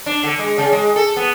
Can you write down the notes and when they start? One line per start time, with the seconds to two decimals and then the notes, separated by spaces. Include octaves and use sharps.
0.06 D4
0.24 D3
0.39 G#3
0.58 C#3
0.72 G#3
0.96 A4
1.16 B3